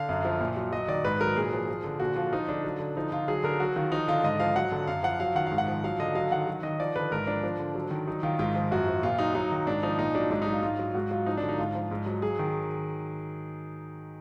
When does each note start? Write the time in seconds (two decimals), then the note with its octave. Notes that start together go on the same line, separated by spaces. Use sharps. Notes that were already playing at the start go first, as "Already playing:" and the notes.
Already playing: D3 F5
0.09 F#2
0.25 F3
0.40 A#2
0.56 F#3
0.72 F#3 D#5
0.88 D#3 D5
1.05 G#2 B4
1.21 F#3 A#4
1.36 A#2 G#4
1.53 F3
1.68 F3
1.84 D3
2.00 A#2 F#4
2.16 F3 F4
2.33 F3 D#4
2.48 D3 D4
2.64 F#3
2.79 D3
2.96 F3 D#4
3.11 D3 F4
3.28 F#3 G#4
3.44 D3 A#4
3.60 F#3 F#4
3.76 D#3 F4
3.91 F3 D#4
4.08 D3 F4
4.23 G#2 D#5
4.40 F3 F5
4.56 F#3 F#5
4.72 D3
4.87 F#2 F5
5.03 F3 F#5
5.20 F#3 F5
5.35 D#3 F#5
5.47 G#2 F5
5.58 F#5
5.68 F3
5.84 F#3 F5
5.99 D3 D#5
6.15 F#3 F5
6.31 D#3 F#5
6.47 F#3
6.63 D#3 D#5
6.80 F3 D5
6.96 D3 B4
7.12 G#2 A#4
7.27 F3 D4
7.43 F3
7.59 D3
7.75 F#3
7.91 D#3
8.08 F#3 D#4
8.23 D#3 F4
8.39 G#2 F4
8.55 F3
8.71 F#2 F#4
8.88 F3
9.03 A#2 F4
9.18 F#3 D#4
9.35 F#3 D#4
9.52 D#3
9.67 G#2 D4
9.83 F3 D#4
9.98 A#2 D#4
10.15 F#3 D4
10.31 G#2 D4
10.42 D#4
10.46 F#3
10.52 F4
10.63 G#2 F4
10.79 F#3
10.94 G#2 F#4
11.11 F#3 F4
11.26 F3 D#4
11.37 D4
11.42 D3
11.49 D#4
11.58 G#2 F4
11.75 F3
11.91 G#2
12.06 F#3
12.22 F#3 G#4
12.39 D#3